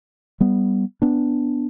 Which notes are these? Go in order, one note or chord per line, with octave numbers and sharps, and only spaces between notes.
G3 B3
B3 D4